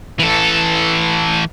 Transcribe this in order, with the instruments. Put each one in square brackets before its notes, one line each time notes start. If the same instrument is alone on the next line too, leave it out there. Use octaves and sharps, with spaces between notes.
[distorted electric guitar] E3 A4